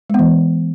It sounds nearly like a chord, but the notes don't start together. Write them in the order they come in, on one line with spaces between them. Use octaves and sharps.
G#3 B3 E3